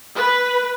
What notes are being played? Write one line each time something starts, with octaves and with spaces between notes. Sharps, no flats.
B4